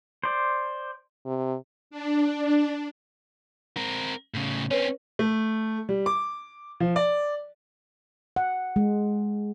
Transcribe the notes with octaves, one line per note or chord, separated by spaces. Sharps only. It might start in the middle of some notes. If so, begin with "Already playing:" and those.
C5 D5
C3
D4
C4 A#4
A2 C#3
C4 C#4 B4 C#5
A3
G3
D6
F3
D5
F#5
G#3